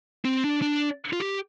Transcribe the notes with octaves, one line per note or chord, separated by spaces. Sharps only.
C4
D4
D4
F4
G4